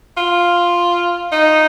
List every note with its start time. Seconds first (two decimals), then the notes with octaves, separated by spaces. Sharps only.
0.17 F4
1.32 D#4